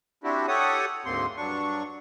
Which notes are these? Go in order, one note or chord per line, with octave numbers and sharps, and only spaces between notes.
C4 D4 E4 F#4 G4
G4 A4 C#5 F#5 D#6
D2 G#2 A#3 C4 C6
G2 F#3 D4 C#6